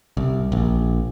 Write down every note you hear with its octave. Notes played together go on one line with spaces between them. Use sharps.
C2
A#1